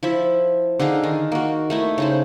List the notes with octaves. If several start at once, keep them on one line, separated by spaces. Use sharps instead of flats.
F3 E4 E5
D3 D#4 G#4 F5
D#3
A#3 F#4
A3 D#4 E4
C#3 D#4 C5